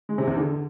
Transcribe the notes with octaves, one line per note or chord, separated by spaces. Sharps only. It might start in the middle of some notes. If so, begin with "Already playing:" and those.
G#3
C3
E2
D3